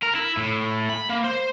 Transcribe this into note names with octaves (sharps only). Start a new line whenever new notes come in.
A#4
E4
A2
B5
A#3
C5